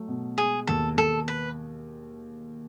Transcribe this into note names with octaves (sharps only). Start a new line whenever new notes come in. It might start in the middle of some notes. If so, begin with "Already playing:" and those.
Already playing: F#3 A3
B2
G#3 G#4
D#2 A4
D#2 A4
B4